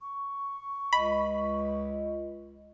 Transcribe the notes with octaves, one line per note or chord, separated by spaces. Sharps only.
C#6
C#2 D#5 B5